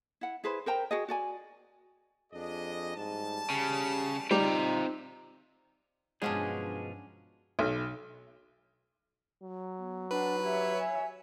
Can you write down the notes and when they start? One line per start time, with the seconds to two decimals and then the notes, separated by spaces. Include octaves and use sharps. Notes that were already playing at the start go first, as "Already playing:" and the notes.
0.21 E4 F#5
0.44 E4 G#4 B4 C5
0.66 A#4 C5 G5 A#5
0.91 F#4 G#4 D#5
1.08 F#4 D5 G#5
2.33 F2 D4 G#4 D#5
2.96 A1 G#2 G3 A5
3.50 C#3 G4
4.31 G3 C4 D#4 F4 A#5
6.22 G2 B2 F3 F#3 G#3 C#4 D4 G#4
7.59 B1
9.43 F#3
9.77 B3
10.11 D4 B4 F#5
10.42 G4 C#5 E5
10.79 G#5